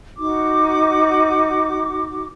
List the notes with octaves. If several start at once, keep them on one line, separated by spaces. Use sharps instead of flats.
D#4 F#4 D6